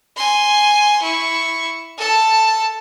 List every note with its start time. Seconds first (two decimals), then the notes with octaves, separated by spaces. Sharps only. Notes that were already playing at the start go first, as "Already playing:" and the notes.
0.16 G#5 C6
1.03 E4 C#6
1.97 A4 A5